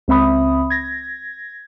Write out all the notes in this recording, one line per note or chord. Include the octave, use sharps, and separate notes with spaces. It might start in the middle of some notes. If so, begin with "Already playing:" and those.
C#2 C4 E5 B5 D#6
G#6 A#6